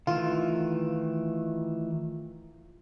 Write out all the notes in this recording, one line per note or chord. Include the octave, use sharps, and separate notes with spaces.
D#3 E3 A3 F4